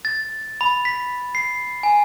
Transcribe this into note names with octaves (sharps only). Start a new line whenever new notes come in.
A6
B5
B6
C7
G#5